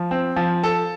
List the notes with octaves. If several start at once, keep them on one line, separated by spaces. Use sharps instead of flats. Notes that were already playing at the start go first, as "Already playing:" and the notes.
Already playing: F3
C4
F3
A4